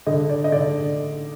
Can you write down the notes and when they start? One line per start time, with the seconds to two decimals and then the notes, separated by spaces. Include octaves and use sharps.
0.07 D3 D#5
0.30 D5
0.44 D#5
0.52 D3 D5